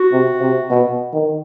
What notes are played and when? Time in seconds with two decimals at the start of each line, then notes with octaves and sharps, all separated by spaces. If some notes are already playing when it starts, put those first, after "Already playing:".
Already playing: F#4
0.12 C3
0.41 C3
0.70 B2
1.13 D#3